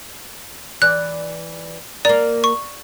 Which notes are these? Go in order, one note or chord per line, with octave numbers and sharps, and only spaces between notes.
E3 D5 F#6
A#3 A#4 D5
C#6